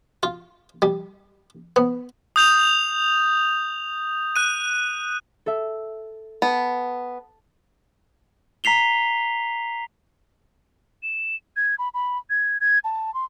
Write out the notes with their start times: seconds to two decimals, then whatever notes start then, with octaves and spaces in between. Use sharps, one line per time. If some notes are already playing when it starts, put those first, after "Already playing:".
0.23 F4
0.82 G3
1.76 B3
2.36 D#6 G6 F7
4.36 F#6 D#7
5.46 A4 E5
6.42 B3 A5
8.64 A#5 B6 C7 F7 G7
11.03 E7
11.56 G#6
11.78 B5
11.94 B5
12.30 G#6
12.60 G#6
12.84 A5
13.14 C6